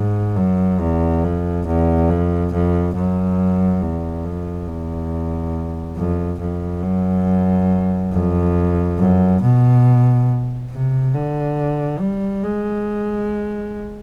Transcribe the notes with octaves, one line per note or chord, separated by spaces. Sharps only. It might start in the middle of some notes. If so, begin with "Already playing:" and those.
Already playing: G#2
F#2
E2
F2
E2
F2
F2
F#2
E2
F2
E2
F2
F2
F#2
F2
F#2
B2
C3
D3
G3
G#3